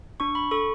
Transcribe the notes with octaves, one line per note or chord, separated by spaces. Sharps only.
D4 C#6
B5
A4 C#6